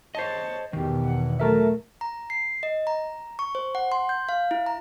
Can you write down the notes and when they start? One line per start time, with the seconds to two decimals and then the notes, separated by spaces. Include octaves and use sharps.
0.15 C5 C#5 D#5 A5
0.73 E2 B2 D#3 G4
1.05 F#5
1.40 F#3 A3 A#4 E5 A5
2.01 A#5
2.30 C7
2.63 D#5
2.87 A#5
3.39 C#6
3.55 C5
3.75 F#5
3.92 C6
4.09 G6
4.29 F5
4.51 E4
4.66 A#5